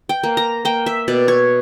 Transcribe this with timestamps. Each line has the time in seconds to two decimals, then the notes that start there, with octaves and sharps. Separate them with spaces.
0.09 G5
0.23 A#3
0.37 A#5
0.65 A#3 G5
0.86 E5
1.08 B2 D5
1.28 C#5